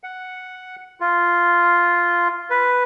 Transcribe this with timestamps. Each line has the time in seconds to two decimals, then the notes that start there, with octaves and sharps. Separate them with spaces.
0.04 F#5
1.00 F4
2.50 B4